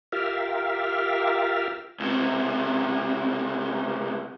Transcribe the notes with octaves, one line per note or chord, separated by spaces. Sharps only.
F4 G4 A#4 E5 F5
C#2 C3